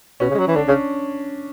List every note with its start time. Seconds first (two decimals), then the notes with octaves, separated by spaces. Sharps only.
0.20 B2 C#4
0.30 C#3
0.35 G#3
0.38 F#3
0.48 E3
0.56 D3 D4
0.68 C#3 C#4